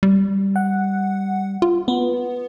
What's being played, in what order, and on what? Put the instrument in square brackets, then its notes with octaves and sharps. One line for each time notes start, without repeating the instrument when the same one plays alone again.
[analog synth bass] G3
[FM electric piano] F#5
[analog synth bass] F4
[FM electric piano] B3